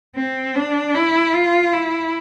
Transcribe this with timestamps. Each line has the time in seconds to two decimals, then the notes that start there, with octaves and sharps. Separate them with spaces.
0.16 C4
0.55 D4
0.94 E4
1.34 F4
1.73 E4